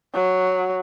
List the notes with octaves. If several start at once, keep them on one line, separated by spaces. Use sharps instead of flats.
F#3